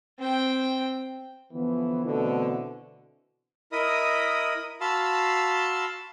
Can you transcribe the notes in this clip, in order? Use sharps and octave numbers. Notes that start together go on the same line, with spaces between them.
C4 G5
D3 E3 F3 B3
B2 D3 E3 A3 C4
E4 A#4 D#5 B5 D#6
F#4 F5 A5 B5 C6 E6